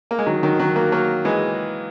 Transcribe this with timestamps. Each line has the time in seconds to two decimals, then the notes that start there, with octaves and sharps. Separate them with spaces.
0.11 A#3
0.19 G#3
0.26 D#3 F#3
0.43 D#3 F#3
0.59 D#3 F#3
0.76 F#3 A#3
0.92 F#3 A#3
1.25 E3 G#3